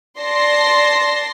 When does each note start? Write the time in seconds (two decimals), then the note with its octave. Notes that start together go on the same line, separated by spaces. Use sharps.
0.20 D5 A5 C6 A#6 C7